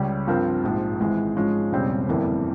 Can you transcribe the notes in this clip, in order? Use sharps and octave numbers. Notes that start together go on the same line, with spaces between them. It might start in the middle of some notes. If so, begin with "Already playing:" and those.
Already playing: C#2 C#3 G3
G2 F3 C4 F4 A#4
A#1 G#2 F3
G#1 G#2 E3 G#3
G#2 F3 G#3 C#4 F4
E1 E2 C#3 G3 C4
G1 F2 E3 G3 A#3